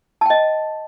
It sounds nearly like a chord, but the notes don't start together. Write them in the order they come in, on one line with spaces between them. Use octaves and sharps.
A5 G5 D#5